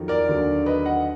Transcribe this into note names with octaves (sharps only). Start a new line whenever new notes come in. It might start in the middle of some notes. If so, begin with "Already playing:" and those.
Already playing: F2 D#3 F#3
A#4 D5
D#2 D3 F#3
B4 D#5
D#5 F#5